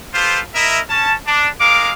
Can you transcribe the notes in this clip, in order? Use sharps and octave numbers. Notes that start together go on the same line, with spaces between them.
F4 G4 A4 B4 C5
E4 A#4 D#5 E5
C#4 A5
D4
G#3 A#4 F5 D6